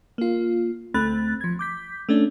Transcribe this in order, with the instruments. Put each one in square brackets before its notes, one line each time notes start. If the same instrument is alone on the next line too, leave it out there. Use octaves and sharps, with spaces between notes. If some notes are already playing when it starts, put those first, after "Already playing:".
[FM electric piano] A#3 F4
D2 A3 C4 B5 F#6 A6
F3 G#6
D6 G6 B6
A3 C#4 D4